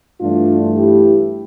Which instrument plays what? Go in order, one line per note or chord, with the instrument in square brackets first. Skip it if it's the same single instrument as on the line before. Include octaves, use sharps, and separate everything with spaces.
[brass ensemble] G2 E3 A3 D4 F4
E4 G4